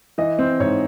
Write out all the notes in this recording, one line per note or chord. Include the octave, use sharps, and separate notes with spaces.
E3 D#5
C4
G#2 C#5